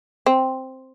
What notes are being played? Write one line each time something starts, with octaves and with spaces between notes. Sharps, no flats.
C4